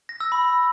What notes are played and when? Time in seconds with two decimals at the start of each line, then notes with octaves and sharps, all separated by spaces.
0.09 A#6
0.20 E6
0.32 B5